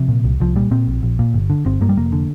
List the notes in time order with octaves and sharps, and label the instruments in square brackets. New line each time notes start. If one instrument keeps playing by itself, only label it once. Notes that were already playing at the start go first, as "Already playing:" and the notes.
Already playing: [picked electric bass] C3 F3
A#2
C2
C2 F3
A#2 G3
A#2 C4
A#1
A#1
A#2
G1
D3
G1 C4
G2 A#3
G3
F1 A#3
D3